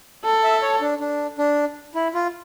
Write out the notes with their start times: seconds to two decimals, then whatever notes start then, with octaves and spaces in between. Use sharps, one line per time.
0.24 A4
0.43 E5
0.62 C#5
0.81 D4
1.00 D4
1.38 D4
1.95 E4
2.14 F4